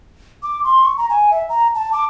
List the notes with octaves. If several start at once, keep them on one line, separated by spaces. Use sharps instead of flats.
D6
C6
C#6
A#5
G#5
E5
A#5
A5
D6